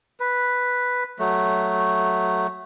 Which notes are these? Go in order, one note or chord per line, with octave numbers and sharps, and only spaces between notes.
B4
F#3 A3